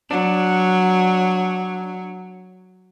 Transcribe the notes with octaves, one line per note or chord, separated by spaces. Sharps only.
F#3 D4